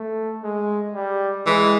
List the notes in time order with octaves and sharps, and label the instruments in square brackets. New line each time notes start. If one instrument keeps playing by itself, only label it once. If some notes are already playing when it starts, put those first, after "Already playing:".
Already playing: [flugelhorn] A3
G#3
G3
[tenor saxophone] E3 [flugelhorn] G#3